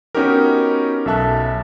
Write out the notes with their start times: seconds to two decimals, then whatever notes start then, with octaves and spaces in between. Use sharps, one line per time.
0.15 B3 C#4 D#4 F#4 G4 A#4
1.06 B1 A4 E5 A5 F#6